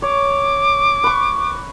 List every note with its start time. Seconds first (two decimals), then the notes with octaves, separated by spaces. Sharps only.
0.02 C#5 D6
1.04 B4 C#6